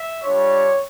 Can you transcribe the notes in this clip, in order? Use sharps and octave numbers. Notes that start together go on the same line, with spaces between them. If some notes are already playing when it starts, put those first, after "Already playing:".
Already playing: E5
G3 D4 F4 C#5